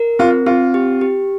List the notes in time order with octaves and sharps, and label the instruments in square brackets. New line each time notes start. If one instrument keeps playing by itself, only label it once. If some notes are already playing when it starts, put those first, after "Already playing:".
Already playing: [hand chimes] A#4
[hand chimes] C4 [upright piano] F4
[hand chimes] C4 [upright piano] F4
[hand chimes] G4
G4